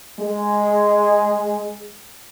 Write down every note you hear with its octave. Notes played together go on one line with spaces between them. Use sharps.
G#3 G#4